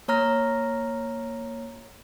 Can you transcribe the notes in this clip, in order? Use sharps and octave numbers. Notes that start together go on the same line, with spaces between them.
A#3 C#5 A#5 F6 A#6